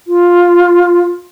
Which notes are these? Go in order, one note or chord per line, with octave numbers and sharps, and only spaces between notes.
F4